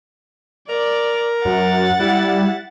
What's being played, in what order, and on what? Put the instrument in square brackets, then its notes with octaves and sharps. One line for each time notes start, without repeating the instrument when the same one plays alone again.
[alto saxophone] A#4 [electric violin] D5
[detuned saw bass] F#2 [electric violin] F#5 A6
[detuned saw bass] G3 [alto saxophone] E4